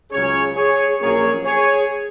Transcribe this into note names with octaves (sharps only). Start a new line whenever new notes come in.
C#2 C#3 F#3 C#4 G#4 C#5
G#4 C#5
A#1 A#2 F#3 A#3 C#4 G#4 C#5
G#4 C#5